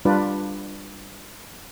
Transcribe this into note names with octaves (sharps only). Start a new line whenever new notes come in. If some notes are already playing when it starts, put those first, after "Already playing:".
G3 D4 F4 B4 D5